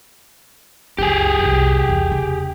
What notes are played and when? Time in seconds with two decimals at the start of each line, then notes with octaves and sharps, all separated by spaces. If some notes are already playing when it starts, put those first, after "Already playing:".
0.98 C#2 F#2 G4 G#4
1.39 C2 F2
1.89 E2
2.11 C#3